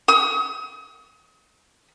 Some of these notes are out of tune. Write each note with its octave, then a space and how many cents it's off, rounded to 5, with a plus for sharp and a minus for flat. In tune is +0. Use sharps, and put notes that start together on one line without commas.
D#6 +40